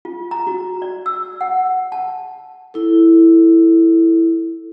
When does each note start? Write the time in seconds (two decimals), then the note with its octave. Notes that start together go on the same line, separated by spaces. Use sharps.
0.05 F4
0.31 A#5
0.47 F#4
0.82 D5
1.06 E6
1.41 F#5
1.92 A5
2.74 E4 A4